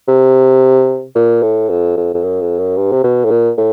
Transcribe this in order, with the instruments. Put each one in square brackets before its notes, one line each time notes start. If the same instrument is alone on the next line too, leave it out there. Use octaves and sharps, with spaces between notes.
[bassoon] C3
A#2
A2
F2
F2
F2
F#2
F2
F#2
G2
C3
B2
A2
A#2
A2